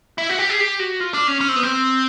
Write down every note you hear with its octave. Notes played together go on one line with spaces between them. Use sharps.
E4
F#4
G4
G#4
G4
F#4
F4
D4
C#4
C#4
C4
B3
C4